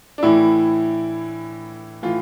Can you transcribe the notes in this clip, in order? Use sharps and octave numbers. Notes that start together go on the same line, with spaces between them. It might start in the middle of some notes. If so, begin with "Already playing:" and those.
D4
A2 E3 E4
A2 E3 F4